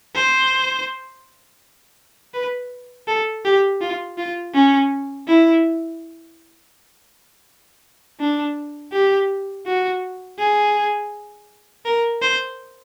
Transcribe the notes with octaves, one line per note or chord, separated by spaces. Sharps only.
C5
B4
A4
G4
F4
F4
C#4
E4
D4
G4
F#4
G#4
A#4
C5